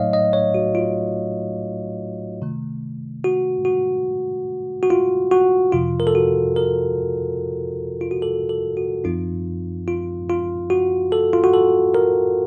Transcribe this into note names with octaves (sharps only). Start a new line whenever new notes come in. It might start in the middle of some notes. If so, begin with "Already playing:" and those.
Already playing: A2 F#3 A3 D#4 C#5 D#5 F5
D#5
C#5
F#4
F4
C3 D#3 A3
F#4
F#4
F#4
F4
F#4
F2 C3 F3 F4
A#4
A4
F#4
A#4
F4
F#4
A4
A4
F#4
F#2 F3 C4 D#4 F4
F4
F4
F#4
A4
F4
F#4
A4
A#4